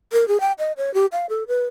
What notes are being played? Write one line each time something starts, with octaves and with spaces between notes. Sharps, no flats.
A#4
G#4
G5
D#5
C#5
G4
F5
A4
B4